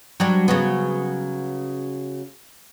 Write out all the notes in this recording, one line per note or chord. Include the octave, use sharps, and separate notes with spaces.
F#3 G3 D4
C#3 F#3 B3